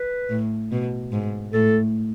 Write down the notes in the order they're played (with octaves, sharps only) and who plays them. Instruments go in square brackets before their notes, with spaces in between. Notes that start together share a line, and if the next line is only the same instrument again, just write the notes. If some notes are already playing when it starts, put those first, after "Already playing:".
Already playing: [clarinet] B4
[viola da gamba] A2
B2
G#2
[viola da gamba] A2 [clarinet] A4